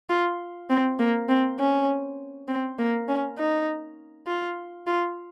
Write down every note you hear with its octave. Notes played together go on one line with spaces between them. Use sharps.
F4
C4
A#3
C4
C#4
C4
A#3
C#4
D#4
F4
F4